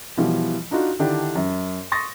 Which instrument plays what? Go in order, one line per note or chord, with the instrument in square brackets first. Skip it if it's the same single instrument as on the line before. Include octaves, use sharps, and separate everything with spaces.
[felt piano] B2 E3 F3 G3
D4 D#4 F4 F#4
D3 D#3 D4 E4 G4
F#2
C6 C#6 D#6 A6 A#6